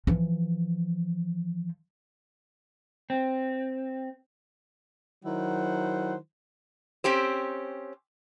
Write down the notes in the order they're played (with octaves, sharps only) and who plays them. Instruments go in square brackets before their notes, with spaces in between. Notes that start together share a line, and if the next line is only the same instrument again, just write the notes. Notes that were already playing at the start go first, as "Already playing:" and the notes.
[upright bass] E3 F3
[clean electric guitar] C4
[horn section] D#3 F#3 E4 C5 F#5
[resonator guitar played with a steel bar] C4 C#4 G4 C5